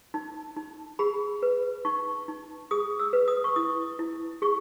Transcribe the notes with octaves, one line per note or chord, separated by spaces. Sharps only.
D#4
D#4
G#4 B5
B4
D#4 C#6
D#4
G#4 D#6
E6
B4
D#6
C#6
E4 D#6
E4
G#4 C#6